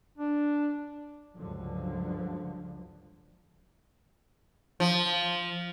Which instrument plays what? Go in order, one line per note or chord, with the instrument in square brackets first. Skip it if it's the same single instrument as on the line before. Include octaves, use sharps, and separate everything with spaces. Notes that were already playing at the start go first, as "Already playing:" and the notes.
[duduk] D4
[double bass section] C#2 G2 D3 F3 F#3
[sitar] F3